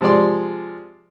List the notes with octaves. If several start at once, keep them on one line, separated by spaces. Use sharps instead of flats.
C3 F3 G#3 D5 C6